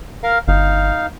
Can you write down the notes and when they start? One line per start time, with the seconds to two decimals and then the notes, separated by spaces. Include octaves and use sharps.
0.23 A#4 F5
0.48 G1 D#4 F5